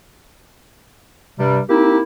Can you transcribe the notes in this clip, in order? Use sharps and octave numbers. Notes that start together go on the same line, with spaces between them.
G2 C3 G3
A#3 C4 D#4 E4 G4